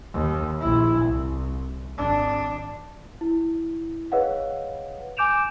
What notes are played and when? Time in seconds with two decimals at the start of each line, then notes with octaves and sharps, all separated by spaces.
0.13 D#2
0.61 A#1 E4
1.01 C2
1.98 G#1 D4
3.21 E4
4.12 G#4 B4 C#5 D#5 F5 F#5
5.17 G#5 D6 G6 D7 E7 F7